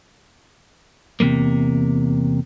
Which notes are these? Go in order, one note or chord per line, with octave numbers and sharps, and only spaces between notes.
E2 C3 F3 G#3 A#3